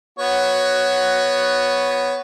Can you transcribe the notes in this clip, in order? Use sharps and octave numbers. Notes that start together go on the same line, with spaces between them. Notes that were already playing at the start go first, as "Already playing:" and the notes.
B3 F#4 C#5